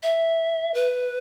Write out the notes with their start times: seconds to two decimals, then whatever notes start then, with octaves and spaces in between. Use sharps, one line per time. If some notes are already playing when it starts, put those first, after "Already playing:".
0.03 E5
0.74 B4